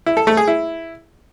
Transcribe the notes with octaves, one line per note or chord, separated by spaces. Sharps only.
E4
A4
A3
G#4
E4